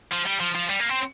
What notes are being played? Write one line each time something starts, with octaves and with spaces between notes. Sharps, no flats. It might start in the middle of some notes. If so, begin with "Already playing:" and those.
F3
G3
F3
F3
G3
A#3
C4